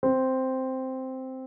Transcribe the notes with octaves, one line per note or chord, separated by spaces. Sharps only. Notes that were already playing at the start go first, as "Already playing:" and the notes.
C4